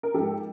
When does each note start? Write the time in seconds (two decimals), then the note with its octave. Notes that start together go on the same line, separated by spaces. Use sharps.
0.03 A#4
0.14 G#2 F3 G4 A4